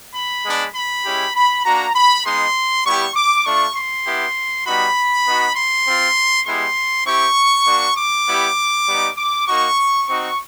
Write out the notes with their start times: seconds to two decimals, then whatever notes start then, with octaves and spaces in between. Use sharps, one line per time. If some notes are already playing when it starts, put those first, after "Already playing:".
0.15 B5
0.45 G#3 B3 D4
0.75 B5
1.05 G#3 C#4 E4 G4
1.36 B5
1.65 A#3 D4 F#4 A#5
1.96 B5
2.26 G#3 B3 D#4 C6
2.85 G3 B3 E4 G4 C#6
3.16 D6
3.46 A3 D4 F4 C#6
3.76 C6
4.06 B3 E4 G4
4.66 G3 B3 D#4 F#4 B5
5.26 B3 D#4 F#4
5.56 C6
5.86 C4 F4
6.47 G#3 B3 E4 G4 C6
7.06 C4 E4 G4 C#6
7.67 A#3 D4 F#4
7.98 D6
8.27 G3 B3 E4 G4
8.87 G3 B3 D#4
9.17 D6
9.47 A#3 D#4 F#4 C#6
10.08 C4 D#4 F#4 C#6